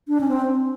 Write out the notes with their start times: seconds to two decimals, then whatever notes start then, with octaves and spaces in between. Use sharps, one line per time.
0.08 D4
0.21 C#4
0.29 C4